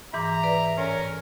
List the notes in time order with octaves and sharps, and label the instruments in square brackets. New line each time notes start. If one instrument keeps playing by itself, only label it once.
[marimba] G#2 E3 D6 [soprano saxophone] E5 [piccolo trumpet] A#5
[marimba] B4 D5
[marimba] A2 [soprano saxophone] C#4 [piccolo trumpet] A#4